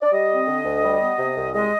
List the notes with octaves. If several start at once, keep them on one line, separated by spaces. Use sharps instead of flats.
D5
G3 D#5
C4
D3
D2
G3
B3
C3
C2
G#3 D#5